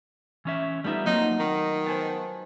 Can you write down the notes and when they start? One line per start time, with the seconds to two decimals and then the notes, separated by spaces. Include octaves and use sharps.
0.45 E3 C#4 E5
0.84 G3 A3 B3 D#4 F4 E5
1.06 F#3 A3 A#3 C4 D#4
1.40 D#3 D#4
1.86 B3 C5 G#5 A5